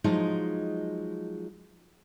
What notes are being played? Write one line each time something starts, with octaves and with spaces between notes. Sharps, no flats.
F3 F#3 G#3 D#4